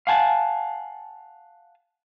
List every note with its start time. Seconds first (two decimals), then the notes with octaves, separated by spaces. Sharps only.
0.07 F5 F#5 G#5 A5